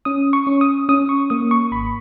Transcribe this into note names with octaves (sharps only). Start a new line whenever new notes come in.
C#4 D#6
C#6
C#4
D#6
C#4 D#6
C#6
A#3 D#6
C#6
G#1 B5